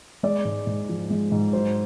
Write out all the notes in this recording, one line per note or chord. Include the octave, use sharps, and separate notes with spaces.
G#3 D5
G#2
G#2
F3
G#3
G#2
F#3 C5